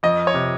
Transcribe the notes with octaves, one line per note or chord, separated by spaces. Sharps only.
F2 D#5
C#5
C3